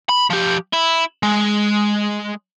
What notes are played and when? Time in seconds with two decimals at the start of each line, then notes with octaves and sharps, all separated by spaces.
0.09 B5
0.30 F3 G4
0.73 E4
1.23 G#3